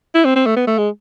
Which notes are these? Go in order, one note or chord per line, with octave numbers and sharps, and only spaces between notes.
E4
C4
C4
A3
B3
A3
G#3